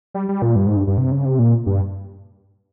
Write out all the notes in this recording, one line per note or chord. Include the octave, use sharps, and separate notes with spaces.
G3
G3
A#2
G2
G#2
G2
G2
C3
C#3
C3
A#2
G2